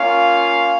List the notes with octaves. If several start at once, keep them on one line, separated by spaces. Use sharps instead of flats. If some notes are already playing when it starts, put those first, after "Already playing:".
Already playing: A#3 C#4 F4 F5